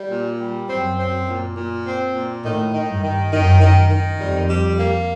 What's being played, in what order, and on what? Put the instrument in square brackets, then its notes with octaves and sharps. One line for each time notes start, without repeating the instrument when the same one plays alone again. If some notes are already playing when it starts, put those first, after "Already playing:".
Already playing: [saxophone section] G3
A#2
G3
[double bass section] F#2 [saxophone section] C4
[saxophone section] C4
A#2
A#2
C4
A#2
[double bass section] A2 [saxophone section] D#3
[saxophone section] D#3
[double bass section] G2
[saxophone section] D#3
[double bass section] F#2 [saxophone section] D#3
[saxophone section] D#3
D#3
[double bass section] F2 [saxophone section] G3
[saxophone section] G3
A#3